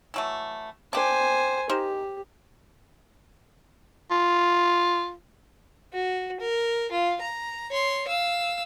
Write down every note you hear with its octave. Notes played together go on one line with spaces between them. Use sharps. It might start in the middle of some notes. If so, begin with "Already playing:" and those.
E3 F#3 A3
D4 G4 C5 G#5
D#4 G4 A#4 C5
F4
F#4
A#4
F4
A#5
C#5 C6
F5 E6